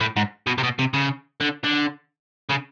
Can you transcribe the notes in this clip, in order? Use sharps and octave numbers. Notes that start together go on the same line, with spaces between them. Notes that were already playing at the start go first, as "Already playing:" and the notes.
A2
G#2
B2
C3
B2
C3
C#3
D3
D3
C#3